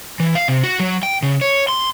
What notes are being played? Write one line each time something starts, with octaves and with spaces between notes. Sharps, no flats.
E3
F5
C3
F#4
F#3
G5
C#3
C#5
C6